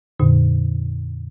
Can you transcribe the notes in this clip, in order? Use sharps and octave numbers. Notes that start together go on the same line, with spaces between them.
F2 A#2 D3